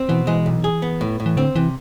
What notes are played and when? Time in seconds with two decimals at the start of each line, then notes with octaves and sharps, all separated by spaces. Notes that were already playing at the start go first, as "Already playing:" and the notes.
Already playing: C4
0.09 B2 E3
0.27 E3 G#3
0.46 B1
0.64 G#4
0.82 B3
1.01 A2
1.20 A2
1.26 E3
1.37 D3 C4
1.55 C3 E3